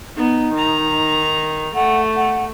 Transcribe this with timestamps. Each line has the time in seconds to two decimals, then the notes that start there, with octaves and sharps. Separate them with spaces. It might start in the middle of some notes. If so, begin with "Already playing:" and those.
0.16 B3 D#4
0.53 D#3 A#5
1.75 A3 F#5
2.16 F#5